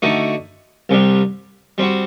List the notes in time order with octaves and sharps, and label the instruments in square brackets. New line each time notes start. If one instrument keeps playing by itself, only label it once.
[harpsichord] D3 A3 D#4 F#4
C2 C3 G3
G3 C4 F#4